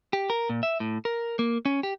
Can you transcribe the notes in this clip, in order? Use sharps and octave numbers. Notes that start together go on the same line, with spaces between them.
G4
A#4
A#2
E5
A2
A#4
A#3
C#4
G4